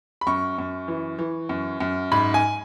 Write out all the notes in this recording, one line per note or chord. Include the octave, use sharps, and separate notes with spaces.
B5
F#2 C#6
F#2
E3
E3
F#2
F#2
G#2 B5
G#5